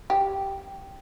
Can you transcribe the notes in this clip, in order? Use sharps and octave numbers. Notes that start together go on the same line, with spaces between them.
G4